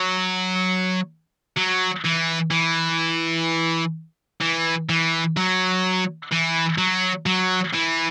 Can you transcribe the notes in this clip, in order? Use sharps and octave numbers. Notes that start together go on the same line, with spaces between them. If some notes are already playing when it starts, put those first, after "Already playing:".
Already playing: F#3
F#3
E3
E3
E3
E3
F#3
E3
F#3
F#3
E3